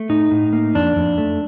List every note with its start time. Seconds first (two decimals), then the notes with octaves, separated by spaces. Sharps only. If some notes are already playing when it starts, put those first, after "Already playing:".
Already playing: A3
0.09 A2 D#4
0.31 A2
0.53 A#3
0.75 F2 D4
0.96 F2
1.18 A3